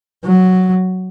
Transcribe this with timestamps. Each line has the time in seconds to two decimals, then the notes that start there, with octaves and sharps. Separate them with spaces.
0.24 F#3